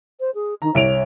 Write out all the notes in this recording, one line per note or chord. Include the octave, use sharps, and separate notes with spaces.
C5
G#4
D#3 A#5
C2 C#5 D7 F7